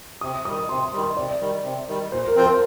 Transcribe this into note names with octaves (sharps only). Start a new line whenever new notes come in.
C3 D#6
D#3 G3 D#6
C3 C6
C6
D#3 G3
C6
C3 D5
D#3 G3
C3
D#3 G3
A#2 C5
A#4
F3 C4 F4 C5
A#4